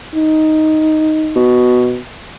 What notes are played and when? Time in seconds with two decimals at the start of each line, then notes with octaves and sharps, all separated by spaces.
0.15 D#4
1.36 B2